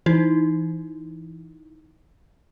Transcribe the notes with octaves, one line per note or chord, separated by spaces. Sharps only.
E3 D#4 E4